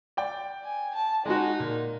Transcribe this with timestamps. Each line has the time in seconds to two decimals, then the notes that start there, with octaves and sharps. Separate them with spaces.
0.17 D5 G5
0.64 G#5
0.95 A5
1.25 G#3 D#4 F#4
1.60 A#2